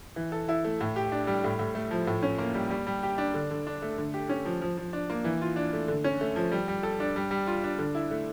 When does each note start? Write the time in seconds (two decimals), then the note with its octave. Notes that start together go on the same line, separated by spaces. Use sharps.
0.16 E3
0.32 A4
0.49 E4
0.65 A3
0.81 A2
0.96 G4
1.12 D4
1.27 G3
1.44 A2
1.59 A2
1.75 A3
1.91 F3
2.07 A2
2.23 C#4
2.38 A#3
2.54 G3
2.70 G3
2.87 G3
3.03 G4
3.18 D4
3.34 D3
3.51 D3
3.67 D4
3.82 A3
3.98 D3
4.14 G4
4.29 C#4
4.45 F3
4.61 F3
4.78 F3
4.93 D4
5.10 A#3
5.24 E3
5.41 F4
5.56 D4
5.73 A3
5.88 D3
6.04 C#4
6.21 A3
6.36 F3
6.52 G3
6.68 G3
6.83 A4
7.00 D4
7.16 G3
7.31 G3
7.47 F4
7.64 D4
7.79 D3
7.95 E4
8.11 A3